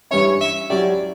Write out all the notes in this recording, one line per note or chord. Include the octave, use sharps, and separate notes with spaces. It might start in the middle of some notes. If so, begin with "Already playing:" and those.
G2 E3 G3 C#4 E4 C#5
E5
F#3 C#4 E4 G4 D5